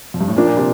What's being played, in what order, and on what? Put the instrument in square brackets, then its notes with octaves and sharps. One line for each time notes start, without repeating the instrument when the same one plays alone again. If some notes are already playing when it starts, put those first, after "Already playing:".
[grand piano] F2
G2
A2
[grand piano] A#2 [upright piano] F3 A#3 D4
[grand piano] A#2
C3